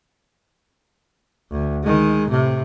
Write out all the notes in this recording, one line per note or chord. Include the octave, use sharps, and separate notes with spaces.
D2
D#3 G#3
A2 C3